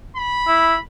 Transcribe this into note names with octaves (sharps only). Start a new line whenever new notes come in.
B5
E4